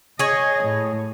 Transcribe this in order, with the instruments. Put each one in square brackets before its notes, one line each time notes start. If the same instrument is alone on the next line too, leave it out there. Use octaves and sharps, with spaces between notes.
[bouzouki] G#4 C#5 [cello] D#5
[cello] A2